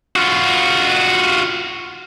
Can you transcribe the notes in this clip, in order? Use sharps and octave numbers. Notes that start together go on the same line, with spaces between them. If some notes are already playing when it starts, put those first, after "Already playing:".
F4 F#4